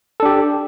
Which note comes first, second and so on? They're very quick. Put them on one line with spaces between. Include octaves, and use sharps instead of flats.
A4 D4 G4